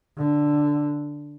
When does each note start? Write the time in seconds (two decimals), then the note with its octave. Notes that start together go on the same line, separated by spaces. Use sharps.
0.18 D3